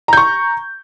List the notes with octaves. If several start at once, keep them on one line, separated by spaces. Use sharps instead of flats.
A#5 C#6 G6